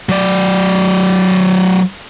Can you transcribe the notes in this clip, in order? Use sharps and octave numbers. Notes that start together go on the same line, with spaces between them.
F#3 D5